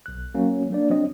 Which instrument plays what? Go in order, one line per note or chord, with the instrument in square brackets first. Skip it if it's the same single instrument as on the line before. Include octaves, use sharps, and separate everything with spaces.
[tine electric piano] B1 F#6
[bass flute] F#3 [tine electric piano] A#3 C#4 F#4
[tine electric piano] A#3 D5 [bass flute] D4
[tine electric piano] F#3 C4 D#5